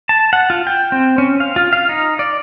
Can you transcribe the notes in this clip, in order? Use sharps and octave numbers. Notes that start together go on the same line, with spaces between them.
A5
F#5
F4
G5
C4
C#4
F5
F4
F5
D#4
D5